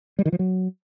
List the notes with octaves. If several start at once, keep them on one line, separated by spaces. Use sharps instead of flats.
G3
D#3
F3
F#3